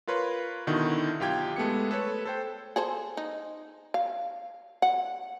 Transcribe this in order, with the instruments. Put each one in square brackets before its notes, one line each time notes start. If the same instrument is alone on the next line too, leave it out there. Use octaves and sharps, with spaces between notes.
[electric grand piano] F4 A#4 B4 C#5 C6
B2 D3 D#3 D#4 E4 F#4
B1 F4 G4 G5 G#6
G#3 A3 B3 C#7
A4 B4 C#5
A4 C5 G5
[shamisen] G#4 A4 C5
D#4
F5
F#5